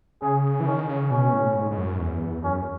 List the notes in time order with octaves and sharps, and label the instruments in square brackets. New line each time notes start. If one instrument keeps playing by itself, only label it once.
[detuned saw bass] C#3 [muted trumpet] G#4
[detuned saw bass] E3
[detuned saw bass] D#3 [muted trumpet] C#4
[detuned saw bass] C#3
[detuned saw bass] B2 [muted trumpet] C#4
[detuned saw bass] A2
G#2
G#2
F#2
E2
[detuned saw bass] F#2 [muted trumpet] C#4